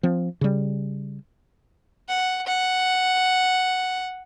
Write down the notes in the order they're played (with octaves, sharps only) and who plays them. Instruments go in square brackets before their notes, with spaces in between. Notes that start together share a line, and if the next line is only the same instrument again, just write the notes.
[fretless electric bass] F3 C4
C#3 G3
[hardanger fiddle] F#5
F#5